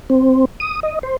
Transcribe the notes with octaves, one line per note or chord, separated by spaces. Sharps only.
C4
D#6
D#5
C5